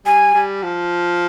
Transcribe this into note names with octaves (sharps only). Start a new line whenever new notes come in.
G3 G#5
G3
F3